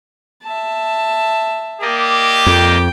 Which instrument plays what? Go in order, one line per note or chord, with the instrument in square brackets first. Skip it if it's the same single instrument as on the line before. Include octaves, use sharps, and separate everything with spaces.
[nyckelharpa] E5 A5
[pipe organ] A#3 D5 D#5 [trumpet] G4
[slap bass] F2 [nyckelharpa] G5